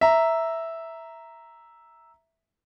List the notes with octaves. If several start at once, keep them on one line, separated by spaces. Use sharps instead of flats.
E5 A#5